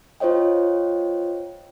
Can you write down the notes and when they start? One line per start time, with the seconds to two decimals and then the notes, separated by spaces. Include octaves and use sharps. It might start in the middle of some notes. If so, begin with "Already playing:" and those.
0.20 F4 C5 C#5 D#5 G5